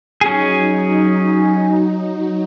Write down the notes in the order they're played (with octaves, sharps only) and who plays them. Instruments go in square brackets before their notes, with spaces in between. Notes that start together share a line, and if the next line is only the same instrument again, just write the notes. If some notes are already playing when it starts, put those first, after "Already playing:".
[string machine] F#3 D#4 [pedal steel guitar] C#4 G#4